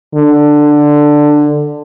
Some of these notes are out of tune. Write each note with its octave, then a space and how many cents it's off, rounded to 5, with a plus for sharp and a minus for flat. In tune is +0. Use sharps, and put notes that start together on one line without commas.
D3 +10